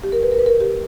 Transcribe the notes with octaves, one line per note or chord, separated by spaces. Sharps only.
G4
A#4
B4
A#4
B4
A#4
G4